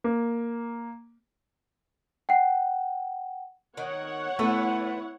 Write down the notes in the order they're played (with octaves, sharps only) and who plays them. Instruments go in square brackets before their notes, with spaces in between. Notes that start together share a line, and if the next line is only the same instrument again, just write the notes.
[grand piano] A#3
[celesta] F#5 G5
[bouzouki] D#3 [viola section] C#5 F#5
[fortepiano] A3 [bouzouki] B3 [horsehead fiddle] E4